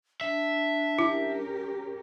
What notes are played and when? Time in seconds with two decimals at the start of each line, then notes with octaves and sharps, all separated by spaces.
0.21 D4 E5
0.99 C#4 E4 G4 A#4